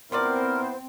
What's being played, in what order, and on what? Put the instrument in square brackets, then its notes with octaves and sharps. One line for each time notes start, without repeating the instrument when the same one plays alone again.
[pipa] G3 F4 D5 [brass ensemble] B3 E4 C5 [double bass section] C4 [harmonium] A#4